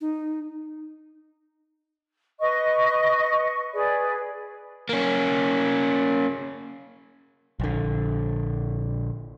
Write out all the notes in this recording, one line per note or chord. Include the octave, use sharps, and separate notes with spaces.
D#4
B4 D#5 C#6
G#4 B4 D5
A#3 C#4
A#1 D3